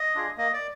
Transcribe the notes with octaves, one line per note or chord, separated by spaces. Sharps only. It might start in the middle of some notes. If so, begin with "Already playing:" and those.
Already playing: D#5
D4 F4 G#4
A#3 D#5
D5